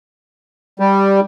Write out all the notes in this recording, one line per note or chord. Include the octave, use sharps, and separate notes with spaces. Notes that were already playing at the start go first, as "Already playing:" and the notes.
G3